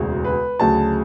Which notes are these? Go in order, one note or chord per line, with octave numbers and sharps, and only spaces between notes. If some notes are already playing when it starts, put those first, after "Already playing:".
Already playing: E1 D2 C#3
B4
D2 C#3 F#3 A5